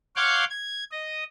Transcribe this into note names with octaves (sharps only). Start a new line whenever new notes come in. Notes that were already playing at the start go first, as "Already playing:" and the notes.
C#5 F5 F#5 C6 D6 G6
G#6
D#5